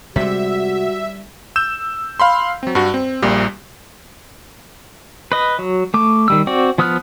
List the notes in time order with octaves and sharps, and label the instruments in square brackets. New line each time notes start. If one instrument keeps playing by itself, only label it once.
[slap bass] C3 G#3 [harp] G3 B6 [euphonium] F#4 [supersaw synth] E5
[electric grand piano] E6 G6 E7
F5 B5 C6
F#3 C4
G2 F#4
C4
A#1 A#2 G3
[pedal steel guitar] B4 D#5
F#3
A3 D6
D#3 G3 E6
C4 F#4 D5
F3 B3 D#6 F6 F#6